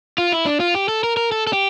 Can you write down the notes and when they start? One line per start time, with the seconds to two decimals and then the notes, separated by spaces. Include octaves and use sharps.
0.18 F4
0.32 E4
0.46 D4
0.60 F4
0.75 G4
0.88 A4
1.03 A#4
1.17 A#4
1.32 A4
1.47 A4
1.53 G4